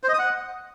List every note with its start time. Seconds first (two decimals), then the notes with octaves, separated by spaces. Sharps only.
0.03 C5
0.09 D#5
0.14 D#6
0.19 F#5